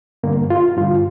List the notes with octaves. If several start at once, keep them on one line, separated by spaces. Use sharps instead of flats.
G2 D3 A#3
F4
G2 D3 F4